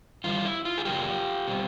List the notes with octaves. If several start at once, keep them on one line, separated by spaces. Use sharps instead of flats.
G2 E3 G3 F4
E4
F4
G#4
F#2 C#3 F#3 A#3 F4 G4
B2 G3 C4